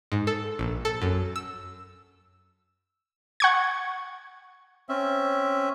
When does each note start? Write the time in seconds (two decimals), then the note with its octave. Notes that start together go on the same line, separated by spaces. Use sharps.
0.12 G#2
0.27 A4
0.59 A#1
0.85 A4
1.02 F#2
1.36 E6
3.40 F#5 C#6 G#6
4.89 C4 C#4 E5